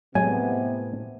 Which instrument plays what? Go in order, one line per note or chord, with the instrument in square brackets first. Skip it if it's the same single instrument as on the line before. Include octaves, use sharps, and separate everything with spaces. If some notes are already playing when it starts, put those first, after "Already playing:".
[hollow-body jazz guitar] A2 [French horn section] C3 B3 [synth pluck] F#3 G#3 [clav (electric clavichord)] G#5